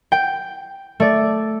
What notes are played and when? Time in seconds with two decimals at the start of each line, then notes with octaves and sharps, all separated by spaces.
0.12 G5
1.00 A3 D5